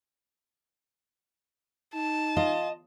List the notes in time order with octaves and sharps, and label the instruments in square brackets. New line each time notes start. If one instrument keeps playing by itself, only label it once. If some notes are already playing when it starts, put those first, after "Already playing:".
[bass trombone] D#4 [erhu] A5
[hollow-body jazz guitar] F4 [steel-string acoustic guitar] D#5